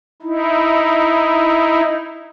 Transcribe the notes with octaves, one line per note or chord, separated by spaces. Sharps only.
D#4 E4